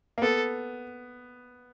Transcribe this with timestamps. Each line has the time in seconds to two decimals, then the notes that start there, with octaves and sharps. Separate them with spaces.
0.18 A#3
0.22 B3 A4